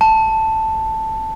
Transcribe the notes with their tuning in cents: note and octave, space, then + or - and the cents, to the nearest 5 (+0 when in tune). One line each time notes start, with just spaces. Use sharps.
A5 +5